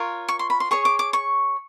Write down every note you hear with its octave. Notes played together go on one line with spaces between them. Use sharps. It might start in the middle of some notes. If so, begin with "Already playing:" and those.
Already playing: F4 A#4 C#5
C#6
C6
B5
C6
G#4 C#5 C#6
D6
D6
C#6